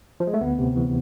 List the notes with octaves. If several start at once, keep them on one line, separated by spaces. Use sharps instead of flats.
F3
G#3
A3
D2 B3
C3
E3